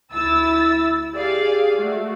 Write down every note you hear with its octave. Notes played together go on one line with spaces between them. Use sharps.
D2 E4 E6 A6
G4 G#4 D5 F5
A3 F#4